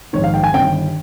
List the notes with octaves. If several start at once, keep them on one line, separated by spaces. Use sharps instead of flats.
A#1 G#2 D#3 C#5
F5
G5
G#5
G1 G2 D#3 G5